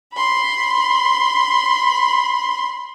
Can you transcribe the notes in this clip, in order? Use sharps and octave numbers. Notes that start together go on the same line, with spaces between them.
B5 C6